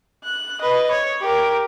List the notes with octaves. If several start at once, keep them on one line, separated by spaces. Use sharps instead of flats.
F#6
B4 D#5
C#5
G4 A#4